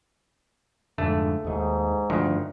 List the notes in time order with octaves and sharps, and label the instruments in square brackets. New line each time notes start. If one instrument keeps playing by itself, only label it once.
[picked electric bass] F2 G#2 D3 [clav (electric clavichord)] A3
[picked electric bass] D#2 D#3 [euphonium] G#2
[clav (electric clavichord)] D2 D#3 [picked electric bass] G2 F3